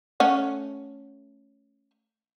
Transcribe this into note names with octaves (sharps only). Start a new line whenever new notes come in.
A3 C#4 F#5